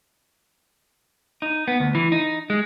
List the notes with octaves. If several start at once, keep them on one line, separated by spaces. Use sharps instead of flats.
D#4
B3
D2
E3
D#4
G#3